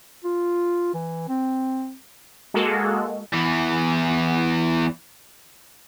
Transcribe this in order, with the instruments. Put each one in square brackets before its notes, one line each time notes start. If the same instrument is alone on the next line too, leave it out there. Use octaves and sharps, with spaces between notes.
[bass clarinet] F4
E3
C4
[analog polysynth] G#3 A#3 F#4 A4
[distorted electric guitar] E2 E3